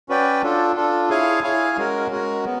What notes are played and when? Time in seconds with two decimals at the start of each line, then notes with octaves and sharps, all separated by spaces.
0.09 C#4 F#4 B4 D5 G5
0.42 D4 F4 A4
0.76 D4 F4 A4
1.09 E4 G#4 C#5 F5 G#5
1.43 E4 G#4 C#5 F5 G#5
1.77 G#3 C#4 F#4 A#4
2.11 G#3 C#4 F#4 A#4
2.45 B3